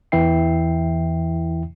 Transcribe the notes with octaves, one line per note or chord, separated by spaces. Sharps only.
E2 E3 E4 E5 G5 C7